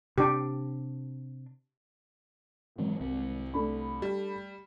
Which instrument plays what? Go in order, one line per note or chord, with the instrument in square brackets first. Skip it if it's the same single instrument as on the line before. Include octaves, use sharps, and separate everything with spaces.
[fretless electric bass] C3 D4 [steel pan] G4
[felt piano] G#1 [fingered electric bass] E3 F#3 G#3
[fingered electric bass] C2 C4
[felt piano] A3 D4 B5
[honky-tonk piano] G3